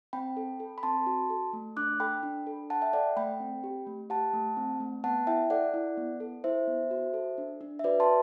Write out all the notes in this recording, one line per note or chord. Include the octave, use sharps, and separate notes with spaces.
C4 G5 B5
A4
A4
B5
C4 A5 C6
F#4
A4
A3
D4 D6 F#6
A4 G5 B5
D4
A4
A4 F#5 A5
E5 G5
A4 D5 F#5
A3 G5 B5
C4
G4
A3
G4 F#5 A5
A3
C4
A3
B3 F#5 A5
E4 E5 G5
A4 D5 F#5
E4
B3
A4
E4 C5 E5
B3
F#4
A4
D4
D4
E5
F#4 B4 D5
A5 C6